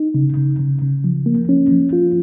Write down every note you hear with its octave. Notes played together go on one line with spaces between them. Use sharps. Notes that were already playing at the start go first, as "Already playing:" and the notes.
Already playing: D#4
C#3
C#3
C#3
C#3
F3
A#3
C#4
F3
F4